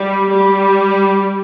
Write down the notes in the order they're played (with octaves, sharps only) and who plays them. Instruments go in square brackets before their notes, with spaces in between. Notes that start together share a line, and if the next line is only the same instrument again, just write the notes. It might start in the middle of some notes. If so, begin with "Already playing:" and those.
Already playing: [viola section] G3
G3